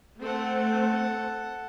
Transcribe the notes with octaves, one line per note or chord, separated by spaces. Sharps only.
A3 C4 A4 F#5